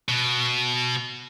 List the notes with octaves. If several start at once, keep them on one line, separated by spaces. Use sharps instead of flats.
B2